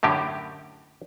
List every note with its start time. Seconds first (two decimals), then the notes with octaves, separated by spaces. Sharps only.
0.03 F#2 A2 D3 G4